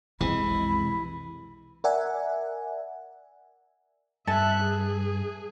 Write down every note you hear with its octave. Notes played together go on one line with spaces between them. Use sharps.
B1 F2 C3 E3 G#3 B5
A#4 D5 E5 F#5 G#5
G2 A4 E5 G#5 A5 F#6
G#4